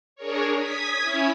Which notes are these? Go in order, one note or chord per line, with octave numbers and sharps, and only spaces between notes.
D4 G#4 A#4 C#5
D#6 G#6 B6
C#4 E4 C#5